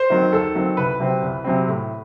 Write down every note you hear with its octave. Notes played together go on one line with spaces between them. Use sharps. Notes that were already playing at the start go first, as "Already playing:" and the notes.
Already playing: C5
D#3 F#3 C4
D#2 A4
D#3 F#3 C4
C2 B4
C3 F#3 C4
C2
C3 F#3 C4
A2